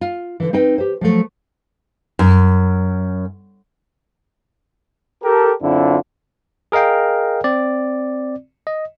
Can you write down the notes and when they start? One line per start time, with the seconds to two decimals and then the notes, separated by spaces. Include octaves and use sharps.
0.01 F4
0.40 D3 E3
0.53 C4 D#4 B4 G5
0.78 G4 C5
1.01 F3 F#3 A3
2.19 F#2
5.23 G4 A4 A#4
5.62 F#2 D3 C4 D4 E4 F4
6.72 G#4 A#4 D#5 F5 G5
7.44 C4 D5
8.67 D#5